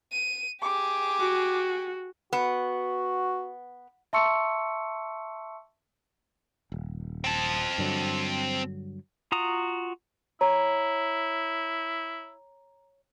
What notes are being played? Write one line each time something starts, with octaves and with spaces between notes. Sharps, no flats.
D#7
G4 G#4 D6
F#4
B3 F#4
E5 A5 C6 C#6 E6 C#7
D#1
C4 A5
G2 D3 F#3
F4 F#4 A#5 D#6
E4 C#5 A#5